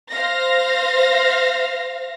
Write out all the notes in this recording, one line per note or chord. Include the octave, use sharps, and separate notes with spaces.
C5 F5 A#6